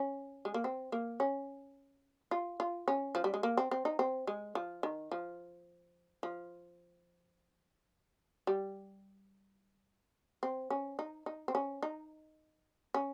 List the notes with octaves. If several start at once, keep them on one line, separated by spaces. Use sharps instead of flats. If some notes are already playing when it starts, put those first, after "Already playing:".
Already playing: C#4
G#3
A#3
C4
A#3
C#4
F4
F4
C#4
F3
G3
G#3
A#3
C4
C4
D#4
C4
G#3
F3
D#3
F3
F3
G3
C4
C#4
D#4
D#4
C4
C#4
D#4
C#4